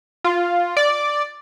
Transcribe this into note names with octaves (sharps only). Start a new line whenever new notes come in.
F4
D5